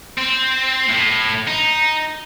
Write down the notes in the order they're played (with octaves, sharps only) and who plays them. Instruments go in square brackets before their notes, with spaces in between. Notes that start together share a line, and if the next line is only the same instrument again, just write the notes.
[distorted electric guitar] C4
A2
D#4